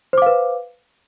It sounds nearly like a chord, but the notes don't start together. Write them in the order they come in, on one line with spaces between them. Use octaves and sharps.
C5 D6 F5 B4